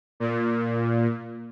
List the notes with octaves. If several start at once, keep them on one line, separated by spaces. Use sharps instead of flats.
A#2